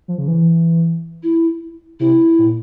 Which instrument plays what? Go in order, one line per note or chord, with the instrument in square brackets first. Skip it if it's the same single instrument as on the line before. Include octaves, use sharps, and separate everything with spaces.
[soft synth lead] F3
C#3
E3
[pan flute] E4
[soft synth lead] C3 [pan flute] E4
[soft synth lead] A#2